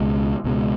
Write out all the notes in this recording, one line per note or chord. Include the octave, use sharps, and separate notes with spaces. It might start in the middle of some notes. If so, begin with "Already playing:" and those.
Already playing: C#2 B2 G#3
C#2 B2 G#3